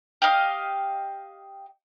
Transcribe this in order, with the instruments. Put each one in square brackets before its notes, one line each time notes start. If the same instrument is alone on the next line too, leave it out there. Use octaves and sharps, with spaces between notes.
[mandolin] G4 D#5 F5